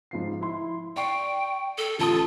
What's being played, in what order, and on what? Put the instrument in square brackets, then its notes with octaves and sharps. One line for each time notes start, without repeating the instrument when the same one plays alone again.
[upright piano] G#2 F3 C7
E4 C6
[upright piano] D5 C#6 C7 [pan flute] G5
[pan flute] A4
[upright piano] A1 A5 D#6 [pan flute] F4